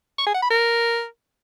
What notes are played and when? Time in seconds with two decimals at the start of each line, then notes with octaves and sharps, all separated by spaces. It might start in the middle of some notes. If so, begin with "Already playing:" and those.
0.18 C#6
0.26 G#4
0.34 F#5
0.42 B5
0.50 A#4